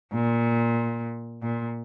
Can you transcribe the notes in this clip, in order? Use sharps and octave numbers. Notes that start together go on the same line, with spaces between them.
A#2
A#2